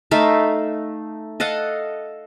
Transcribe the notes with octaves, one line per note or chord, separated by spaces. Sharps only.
A3 D#4 E5 F5
A4 D#5 F5 F#5